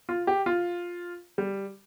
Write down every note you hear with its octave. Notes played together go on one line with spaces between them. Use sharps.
F4
G4
F4
G3